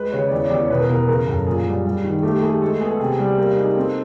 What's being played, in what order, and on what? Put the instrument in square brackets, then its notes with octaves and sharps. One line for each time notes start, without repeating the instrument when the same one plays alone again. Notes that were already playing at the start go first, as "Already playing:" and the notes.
Already playing: [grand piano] G#3 B4
C#3 C#5
D5
E2 C#5
D5
E2
C#5
B2 B4
A#4
B2 A#4
B4
C#3 A#4
F#2 A4
A#2 G#4
G3
G3
D#3
A3 G4
A3 G#4
G#3 A4
B3 G#4
A4
C3 G#4
G3
A#3 G4
D#4 G#4
C4 A4